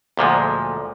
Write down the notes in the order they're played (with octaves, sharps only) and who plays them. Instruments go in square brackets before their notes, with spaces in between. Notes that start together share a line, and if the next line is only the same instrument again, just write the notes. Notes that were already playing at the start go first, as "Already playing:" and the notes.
[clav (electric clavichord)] D2 A#2 F3 G#3